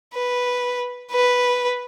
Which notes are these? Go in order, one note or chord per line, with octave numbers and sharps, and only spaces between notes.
B4
B4